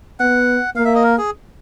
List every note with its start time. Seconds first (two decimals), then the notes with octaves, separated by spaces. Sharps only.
0.20 B3 F#5
0.76 A#3 F5
0.85 E5
0.95 D#5
1.03 A#4
1.18 G#4